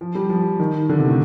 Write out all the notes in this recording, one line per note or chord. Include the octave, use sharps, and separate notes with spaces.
F3
G3
F3
D#3
D3
C3
A2